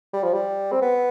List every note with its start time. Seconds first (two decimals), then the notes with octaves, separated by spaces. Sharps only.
0.14 G3
0.23 F3
0.34 G3
0.72 C4
0.82 B3